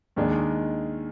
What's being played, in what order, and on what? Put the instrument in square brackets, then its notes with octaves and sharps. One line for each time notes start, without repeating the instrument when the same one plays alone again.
[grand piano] D#2 D#3 G#3 D4